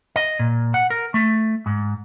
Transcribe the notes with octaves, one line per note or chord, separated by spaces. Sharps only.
D#5
A#2
F#5
A#4
A3
G#2